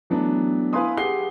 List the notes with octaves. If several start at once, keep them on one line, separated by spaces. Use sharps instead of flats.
E3 F#3 A3 B3 D4
E4 B4 F5 G#5 C6 D#6
G4 G#4 F#5 C7 G7